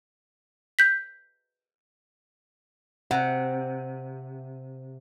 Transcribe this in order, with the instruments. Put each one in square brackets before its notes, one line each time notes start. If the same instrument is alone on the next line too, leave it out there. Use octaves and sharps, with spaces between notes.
[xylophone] G6 B6
[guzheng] C3 [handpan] F#5